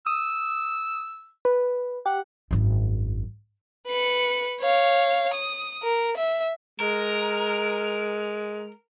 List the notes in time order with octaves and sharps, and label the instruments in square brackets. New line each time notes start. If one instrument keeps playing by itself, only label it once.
[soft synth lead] D#6 [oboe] E6
[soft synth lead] B4
[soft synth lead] G4 [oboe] F#5
[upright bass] G#1 F#2
[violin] B4 C#7
C#5 F5
D#6
A#4
E5
[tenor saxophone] G#3 [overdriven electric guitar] A#4